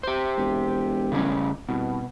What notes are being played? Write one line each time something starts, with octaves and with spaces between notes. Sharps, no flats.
G4 C5
E1
C#3 G3 C#4
C2 B2